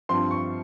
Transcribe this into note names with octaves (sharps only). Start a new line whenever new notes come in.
G2 F3 C4 C6
C#6